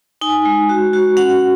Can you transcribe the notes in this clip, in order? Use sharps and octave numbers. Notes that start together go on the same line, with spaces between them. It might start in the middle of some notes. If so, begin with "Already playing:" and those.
D#4 G#5
G#3
F#4
F#4
C#4 F#5